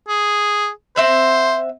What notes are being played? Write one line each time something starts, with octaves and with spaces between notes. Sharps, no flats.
G#4
C4 C5 E5 F#5